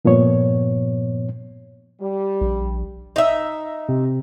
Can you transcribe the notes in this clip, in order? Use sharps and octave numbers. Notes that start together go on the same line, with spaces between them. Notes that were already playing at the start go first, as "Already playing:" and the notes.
G2 A#2 F3 B3 C#5
G3
A#1
D#4 E5
C3